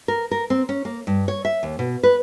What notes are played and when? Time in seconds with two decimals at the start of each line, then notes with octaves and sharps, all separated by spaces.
0.08 A#4
0.31 A#4
0.50 C4
0.69 C#4
0.85 A#3
1.07 G2
1.28 C#5
1.45 E5
1.63 D#2
1.79 B2
2.03 B4